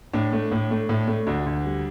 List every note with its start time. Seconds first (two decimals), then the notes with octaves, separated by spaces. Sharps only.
0.13 A2 D4
0.32 A3
0.51 A2
0.71 A3
0.89 A2
1.08 A3
1.27 D2 D4
1.46 D2
1.65 G3